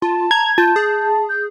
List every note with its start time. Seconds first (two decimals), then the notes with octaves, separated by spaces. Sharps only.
0.02 F4 A5
0.31 A#5 G#6
0.58 F4 A5 G6
0.76 G#4
1.29 G6